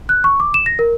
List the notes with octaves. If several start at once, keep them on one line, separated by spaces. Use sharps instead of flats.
F#6
C#6
D6
E7
A#6
A#4